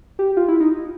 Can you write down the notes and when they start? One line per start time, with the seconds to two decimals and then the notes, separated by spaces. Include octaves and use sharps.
0.19 G4
0.37 F4
0.48 E4
0.60 D#4